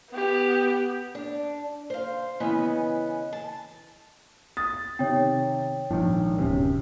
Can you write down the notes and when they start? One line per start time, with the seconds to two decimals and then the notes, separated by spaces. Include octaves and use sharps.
0.11 B3 G4
1.15 D4
1.90 C5 F5
2.40 C#3 E3 B3 C#4 B4 D#5
3.33 A5
4.57 D#6 A6
4.99 C3 D#3 C#5 G5
5.91 A#1 G#2 D#3
6.39 D1 F#2 C3 C#4